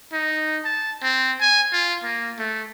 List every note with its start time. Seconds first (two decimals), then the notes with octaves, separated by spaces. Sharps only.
0.13 D#4
0.65 A5
1.03 C4
1.40 G#5
1.72 F4
2.04 A#3
2.39 A3